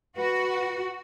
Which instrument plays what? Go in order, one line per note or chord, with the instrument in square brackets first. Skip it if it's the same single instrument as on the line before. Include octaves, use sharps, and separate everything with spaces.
[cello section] F#4 [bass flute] B4